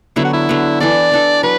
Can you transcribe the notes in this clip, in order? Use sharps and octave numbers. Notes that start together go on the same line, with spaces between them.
D3 F#3 B3 E4
F#4
E4
D3 F#3 B3
E3 D4 A4 D5
E3 D4 A4
F#3 B4